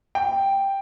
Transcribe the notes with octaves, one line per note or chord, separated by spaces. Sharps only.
G5